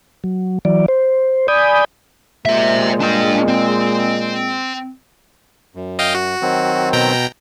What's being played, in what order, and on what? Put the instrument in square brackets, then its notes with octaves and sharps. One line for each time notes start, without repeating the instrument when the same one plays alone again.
[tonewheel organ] F#3
E3 F#3 D5
C5
D5 G#5 B5 D#6 G6
[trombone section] A#2 G#3 [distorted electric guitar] C5 E5
[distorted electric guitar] D4 G5
C4
[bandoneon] F#2
[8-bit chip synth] D#5 F5 G5
F#4
[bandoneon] D#3 F#3 C4
[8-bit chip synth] B2 G5 A#5